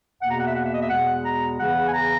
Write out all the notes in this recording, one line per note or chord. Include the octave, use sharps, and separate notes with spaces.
E2 B2 A#3 F#5
A#5
F#5
E5
F#5
E5
D#5
E5
E2 B2 G#3 F#5
A#5
E2 C#3 E3 F#5
G#5
A#5